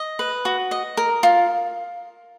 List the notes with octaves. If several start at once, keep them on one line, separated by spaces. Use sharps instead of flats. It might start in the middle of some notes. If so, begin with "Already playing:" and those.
Already playing: D#5
B4
F#4
D#5
A#4
F4